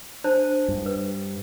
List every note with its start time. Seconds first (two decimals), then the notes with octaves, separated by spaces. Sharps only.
0.24 D4 C5 A5
0.68 G2
0.86 B4